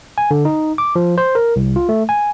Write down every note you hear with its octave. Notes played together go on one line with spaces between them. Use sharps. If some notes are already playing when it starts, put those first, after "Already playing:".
G#5
D3
D#4
D6
F3
C5
A#4
C2
F4
A3
G#5